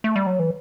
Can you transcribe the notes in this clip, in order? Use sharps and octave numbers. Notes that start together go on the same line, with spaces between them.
A3
G3
F#3
E3